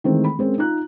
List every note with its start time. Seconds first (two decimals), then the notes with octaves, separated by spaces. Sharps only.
0.04 D#3 E3 G#3 A3 C4
0.24 B5
0.39 G#3 C4 C#4 A#4
0.58 D#4 F4 A#5 F#6